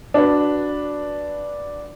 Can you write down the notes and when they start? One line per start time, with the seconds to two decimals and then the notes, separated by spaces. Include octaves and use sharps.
0.14 D4 F#4 B4